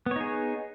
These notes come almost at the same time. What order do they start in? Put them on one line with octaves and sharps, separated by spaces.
B3 C#5 D#4 G#4